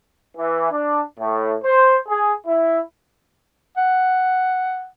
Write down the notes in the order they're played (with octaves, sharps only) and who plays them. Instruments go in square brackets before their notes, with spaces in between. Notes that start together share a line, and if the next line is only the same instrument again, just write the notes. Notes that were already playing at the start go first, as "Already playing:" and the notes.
[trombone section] E3
D4
A2
C5
G#4
E4
[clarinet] F#5